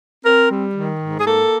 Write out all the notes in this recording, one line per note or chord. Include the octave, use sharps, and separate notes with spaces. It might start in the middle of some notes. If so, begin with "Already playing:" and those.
C4 A#4
G3
D#3
G#2
G#4
A#3 A4